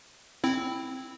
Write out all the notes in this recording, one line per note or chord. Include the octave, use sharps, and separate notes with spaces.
C4 E4